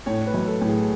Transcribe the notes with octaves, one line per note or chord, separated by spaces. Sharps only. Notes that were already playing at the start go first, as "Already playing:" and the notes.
A2 C#5
C#5
B4
B1
A4
A2
G#4